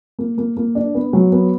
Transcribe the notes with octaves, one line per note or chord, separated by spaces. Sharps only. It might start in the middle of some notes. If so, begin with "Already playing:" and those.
A#3
A#3
A#3
D4
B3
F#3
B3